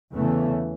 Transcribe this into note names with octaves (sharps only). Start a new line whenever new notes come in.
E2 C#3 E3 A3